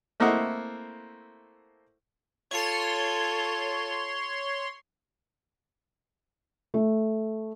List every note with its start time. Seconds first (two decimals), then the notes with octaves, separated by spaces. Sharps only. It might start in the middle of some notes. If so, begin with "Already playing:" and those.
0.20 A3 A#3 C4 E4 D#5 F#5
2.51 F4 A4 C#5 C6
6.74 A3